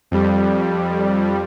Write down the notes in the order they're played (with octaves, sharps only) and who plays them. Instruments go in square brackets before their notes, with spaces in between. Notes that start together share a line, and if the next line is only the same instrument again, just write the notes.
[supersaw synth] F2 G3